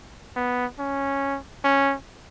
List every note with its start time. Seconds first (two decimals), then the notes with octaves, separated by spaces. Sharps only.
0.36 B3
0.79 C#4
1.64 C#4